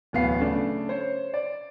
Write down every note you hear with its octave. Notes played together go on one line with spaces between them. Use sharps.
D1 E2 B3 F5 C7
C#3 A3 D4
C5 C#5
D5